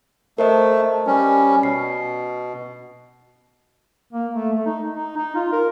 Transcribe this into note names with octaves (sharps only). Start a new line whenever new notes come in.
A3 A#4 C5 D#5
G3 C#4
B2 C7
A#3
A3
A3
D#4
D#4
D#4
F4
A#4